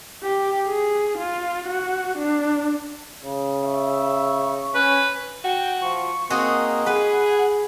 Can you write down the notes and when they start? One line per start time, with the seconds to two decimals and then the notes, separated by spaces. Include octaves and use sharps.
0.23 G4
0.66 G#4
1.18 F4
1.67 F#4
2.18 D4
3.24 C#3
3.63 E5 C#6
4.75 C#4 B4
5.44 F#4 G5
5.82 F3 C#6
6.30 A#3 C4 D#4 F#4 G#4
6.86 G#4 B4 F#5